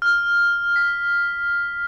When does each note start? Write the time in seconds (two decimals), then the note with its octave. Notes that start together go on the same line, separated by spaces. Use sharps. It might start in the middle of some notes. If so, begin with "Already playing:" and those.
0.02 F6
0.76 B6